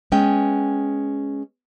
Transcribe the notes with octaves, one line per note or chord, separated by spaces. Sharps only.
G#3 B3 C#4 G5